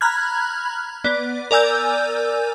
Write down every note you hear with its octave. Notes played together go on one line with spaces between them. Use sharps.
A#5 B5 F6 F#6 G#6
B3 D5
A#4 D5 G#5 E6 G6